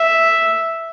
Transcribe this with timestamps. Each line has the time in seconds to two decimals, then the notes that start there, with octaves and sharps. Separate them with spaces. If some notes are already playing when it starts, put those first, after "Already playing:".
Already playing: E5